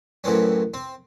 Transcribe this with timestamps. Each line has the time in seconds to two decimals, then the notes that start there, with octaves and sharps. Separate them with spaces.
0.24 F#2 A2 E3 C4 C#4
0.74 C4